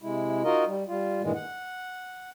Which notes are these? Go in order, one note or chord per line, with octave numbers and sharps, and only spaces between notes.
C3 G#3 E4
D#4 F4 F#4 A#4 D#5
G3
G3 F4
G2 A#2 D#3 E3 G#3
F#5